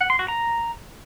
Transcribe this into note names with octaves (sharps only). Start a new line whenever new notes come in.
F#5
C6
F#4
A#5